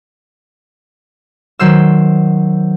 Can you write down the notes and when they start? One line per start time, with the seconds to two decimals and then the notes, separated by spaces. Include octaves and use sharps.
1.59 D#3 F#3 C5 E6